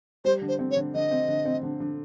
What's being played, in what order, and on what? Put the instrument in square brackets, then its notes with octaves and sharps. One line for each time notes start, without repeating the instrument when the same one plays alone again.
[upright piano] G3 [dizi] C5
[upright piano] D3
[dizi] C5
[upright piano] C4
[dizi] C#5
[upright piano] D3
[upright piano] D3 [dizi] D#5
[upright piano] C4
D3
C4
D3
D3